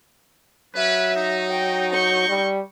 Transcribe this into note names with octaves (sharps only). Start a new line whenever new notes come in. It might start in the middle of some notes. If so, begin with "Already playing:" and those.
F#3 C#4 B4 E5
D#4
G5
C#6 G6
G3